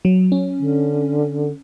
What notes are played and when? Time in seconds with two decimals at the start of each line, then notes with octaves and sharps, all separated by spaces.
0.05 F#3
0.32 C#4
0.60 D3